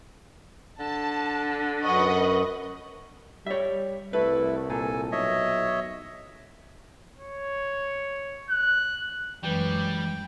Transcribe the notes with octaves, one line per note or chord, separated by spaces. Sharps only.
D3 A5
F#2 B4 D#5 F#5 C#6
G3 C#5 E5
C2 A3 E4 A4 B4
A#2 A4 G#5
B1 C#5 D#5 E5
C#5
F#6
F#2 E3 G3 G#3 G5